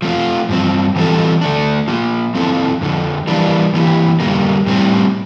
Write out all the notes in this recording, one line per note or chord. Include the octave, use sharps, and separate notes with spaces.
F3 A3 C4 F4
G2 F3 C4
E3 G3 C4 F4 A4
D3 A3 D4
F3 A#3 F4
F3 C4 E4 A4
F2 D3 F3
E3 G3 A#3 D4
E3 A#3 E4 G4
F2 D3 G3 A#3
A2 G3 C4